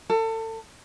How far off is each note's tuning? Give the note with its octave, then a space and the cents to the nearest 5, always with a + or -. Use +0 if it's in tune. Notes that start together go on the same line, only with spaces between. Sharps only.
A4 +30